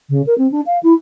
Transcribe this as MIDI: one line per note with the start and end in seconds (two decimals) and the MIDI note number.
0.10 0.22 49
0.26 0.34 70
0.38 0.49 60
0.51 0.61 62
0.66 0.77 77
0.83 0.93 64